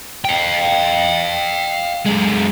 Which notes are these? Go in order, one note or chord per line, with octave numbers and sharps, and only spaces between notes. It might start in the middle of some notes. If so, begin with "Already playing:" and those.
F5 G5
F#2 G#3